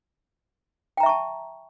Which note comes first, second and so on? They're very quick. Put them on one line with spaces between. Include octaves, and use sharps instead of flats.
G5 A#5 E5 C#6 A5